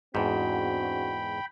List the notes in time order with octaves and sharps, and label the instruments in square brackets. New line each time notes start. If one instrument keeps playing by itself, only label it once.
[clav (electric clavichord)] E2 G#2 [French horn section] C4 D4 F#4 [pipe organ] G5 B5